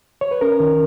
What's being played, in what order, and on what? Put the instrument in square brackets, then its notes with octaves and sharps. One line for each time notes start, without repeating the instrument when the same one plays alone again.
[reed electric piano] C#5
B4
C#4 A#4
D#3